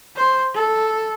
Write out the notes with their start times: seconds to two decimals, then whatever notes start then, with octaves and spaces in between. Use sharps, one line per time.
0.16 C5
0.54 A4